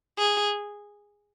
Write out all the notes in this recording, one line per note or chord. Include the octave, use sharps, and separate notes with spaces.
G#4